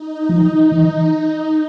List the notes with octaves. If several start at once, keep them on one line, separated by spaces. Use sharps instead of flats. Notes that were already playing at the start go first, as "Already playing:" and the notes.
Already playing: D#4
F3
E3